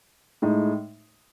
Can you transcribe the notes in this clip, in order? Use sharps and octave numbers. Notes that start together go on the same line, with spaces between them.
A2 G#3 D#4